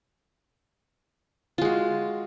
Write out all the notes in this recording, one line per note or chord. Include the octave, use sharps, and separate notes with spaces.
G#3 F4 F#4